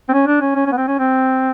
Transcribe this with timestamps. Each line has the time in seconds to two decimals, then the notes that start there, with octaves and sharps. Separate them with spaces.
0.09 C4
0.13 C#4
0.27 D4
0.41 C#4
0.56 C#4
0.66 C#4
0.72 B3
0.78 C4
0.88 C#4
0.99 C4